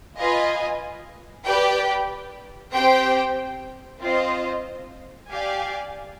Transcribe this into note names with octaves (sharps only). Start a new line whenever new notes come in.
F4 B4 D#5 G#5
G4 B4 D5 G5
C4 G4 C5 G5
C4 F4 C5 D#5
G4 D5 F5 G#5